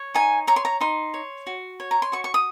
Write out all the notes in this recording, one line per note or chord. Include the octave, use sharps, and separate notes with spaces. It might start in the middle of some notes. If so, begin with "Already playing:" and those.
Already playing: C#5
D#4 G#5
C#5 A#5
C6
A#5
D#4 C6
C#5
F#4
C#5
A#5
C6
F#4 C#6
C#6
D#6